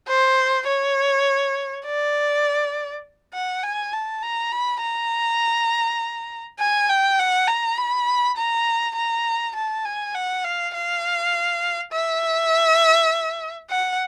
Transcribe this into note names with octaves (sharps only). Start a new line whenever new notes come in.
C5
C#5
D5
F#5
G#5
A5
A#5
B5
A#5
G#5
G5
F#5
A#5
B5
A#5
A#5
A5
G#5
F#5
F5
F5
E5
F#5